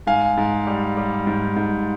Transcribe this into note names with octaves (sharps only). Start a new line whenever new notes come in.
G#2 F5 G#5
G#2
G3
G3
G#2
G#2